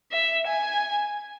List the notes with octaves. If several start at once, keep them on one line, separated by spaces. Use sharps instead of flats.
E5
G#5